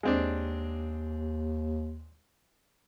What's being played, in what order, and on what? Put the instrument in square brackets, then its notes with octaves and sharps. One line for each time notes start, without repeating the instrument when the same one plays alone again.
[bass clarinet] D#2 [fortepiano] G#3 C4 D4